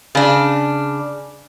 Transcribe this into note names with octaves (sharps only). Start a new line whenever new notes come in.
C#3 D4